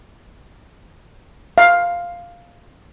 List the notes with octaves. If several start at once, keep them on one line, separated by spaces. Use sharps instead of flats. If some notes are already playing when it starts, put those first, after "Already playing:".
F5